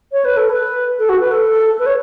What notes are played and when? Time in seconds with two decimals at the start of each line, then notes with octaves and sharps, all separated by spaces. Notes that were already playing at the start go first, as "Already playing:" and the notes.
0.12 C#5
0.25 B4
0.37 A4
0.50 B4
0.99 A4
1.09 F#4
1.21 B4
1.31 A4
1.79 B4
1.86 C#5